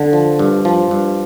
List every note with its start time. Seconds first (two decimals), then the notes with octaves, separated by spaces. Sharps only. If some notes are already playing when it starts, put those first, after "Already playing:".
Already playing: D3
0.13 F3
0.39 G2
0.65 F3
0.91 G2